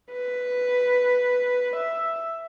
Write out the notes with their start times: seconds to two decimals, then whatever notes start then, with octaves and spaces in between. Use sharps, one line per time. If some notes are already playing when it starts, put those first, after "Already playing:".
0.13 B4
1.76 E5